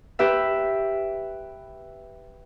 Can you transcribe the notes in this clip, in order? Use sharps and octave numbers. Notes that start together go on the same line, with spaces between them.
G4 B4 E5